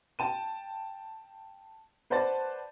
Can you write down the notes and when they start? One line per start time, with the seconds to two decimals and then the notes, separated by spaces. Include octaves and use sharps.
0.19 G5 A5 D#7
2.10 B4 C5 D5 F#5 A5 A6